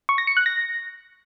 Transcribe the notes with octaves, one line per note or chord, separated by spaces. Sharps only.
C#6
A#6
C#7
F#6
A#6